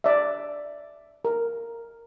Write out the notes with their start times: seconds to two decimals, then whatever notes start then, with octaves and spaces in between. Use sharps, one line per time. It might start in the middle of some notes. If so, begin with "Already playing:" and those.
0.04 D5 E5
1.25 A#4